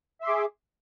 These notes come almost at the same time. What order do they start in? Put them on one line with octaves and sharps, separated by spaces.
E5 C6 D6 G#4